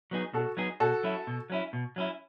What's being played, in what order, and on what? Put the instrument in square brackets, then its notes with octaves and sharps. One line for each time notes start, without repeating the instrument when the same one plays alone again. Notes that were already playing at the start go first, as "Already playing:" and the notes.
[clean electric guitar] F#3 B3 D#4 G#4
[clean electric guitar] B2 [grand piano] F#4 A4
[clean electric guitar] F#3 B3 D#4 G#4
[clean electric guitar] B2 [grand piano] F#4 A4
[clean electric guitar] F#3 C#4 E4
B2
F#3 C#4 E4
B2
F#3 C#4 E4